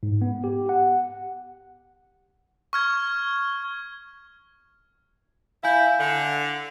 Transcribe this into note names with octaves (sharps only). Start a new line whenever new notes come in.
G#2
B3
G4
F#5
C#6 F6 G#6
E4 F5 G#5 G6
D3